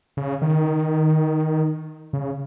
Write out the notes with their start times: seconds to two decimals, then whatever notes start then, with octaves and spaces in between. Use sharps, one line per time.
0.17 C#3
0.42 D#3
2.13 C#3